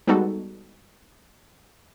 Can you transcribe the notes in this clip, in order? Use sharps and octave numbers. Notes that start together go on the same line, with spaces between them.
G3 G#3 B3 D#4 F#4 A4